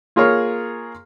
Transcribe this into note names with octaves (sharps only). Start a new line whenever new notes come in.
A#3 F4 G#4 A#4 C#5